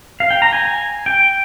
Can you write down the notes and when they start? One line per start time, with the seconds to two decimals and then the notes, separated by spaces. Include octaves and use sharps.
0.20 F5
0.31 G5
0.42 A#5
0.53 G#5
0.64 G#5
1.06 G5